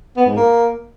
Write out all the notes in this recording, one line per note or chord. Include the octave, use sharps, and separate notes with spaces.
B3
G#2
A#3